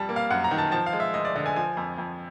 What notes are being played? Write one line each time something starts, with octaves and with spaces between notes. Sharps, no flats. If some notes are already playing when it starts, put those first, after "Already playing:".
Already playing: F2 G3 A5
A#3
F5
F#2 F#5
A#5
D#3
A5
F3 A5
F5
G#3
E5
D2 D#5
D5
D3 D#5
G#5
F3 G#5
F2
F2